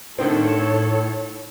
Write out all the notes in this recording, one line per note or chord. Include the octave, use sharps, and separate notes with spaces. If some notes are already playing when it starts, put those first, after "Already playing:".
A2 D3 D#3 C4 A4 C#5